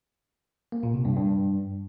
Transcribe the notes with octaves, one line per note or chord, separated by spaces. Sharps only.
A#3
A#2
C3
G2
G2